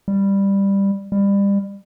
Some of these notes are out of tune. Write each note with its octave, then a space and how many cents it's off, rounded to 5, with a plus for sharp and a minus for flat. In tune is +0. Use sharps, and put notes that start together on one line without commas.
G3 +10
G3 +30